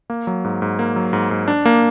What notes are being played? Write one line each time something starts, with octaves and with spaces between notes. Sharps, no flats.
A#3
F#3
G#2
G#2
A#3
F#3
G#2
G#2
D4
A#3